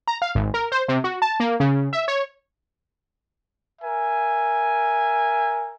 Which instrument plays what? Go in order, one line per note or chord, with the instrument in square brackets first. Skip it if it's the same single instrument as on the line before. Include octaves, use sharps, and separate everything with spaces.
[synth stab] A#5
F5
G#1
A#4
C5
C3
F#4
A5
A#3
C#3
E5
C#5
[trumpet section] A#4 E5 G#5